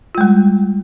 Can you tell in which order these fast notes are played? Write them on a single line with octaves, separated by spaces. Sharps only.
F4 G#3 G3